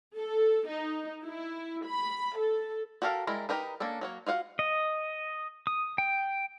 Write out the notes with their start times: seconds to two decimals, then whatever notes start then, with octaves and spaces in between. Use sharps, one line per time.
0.16 A4
0.67 D#4
1.24 E4
1.86 B5
2.38 A4
3.02 F#4 G4 A4 A#4 F5
3.27 G3 G#3 E4 A#4
3.49 D#4 G4 A#4 B4
3.80 A#3 C#4 D4 A4
4.01 F#3 A#3 C#5
4.26 F4 F#4 F5 F#5
4.59 D#5
5.67 D#6
5.98 G5